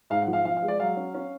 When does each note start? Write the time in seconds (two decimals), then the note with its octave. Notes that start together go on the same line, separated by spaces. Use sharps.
0.10 G#2 F5
0.22 F#5
0.27 F3
0.33 F5
0.45 F3 F5
0.57 F5
0.62 G#3
0.68 D5
0.80 F#3 F5
0.97 C#4
1.14 C#4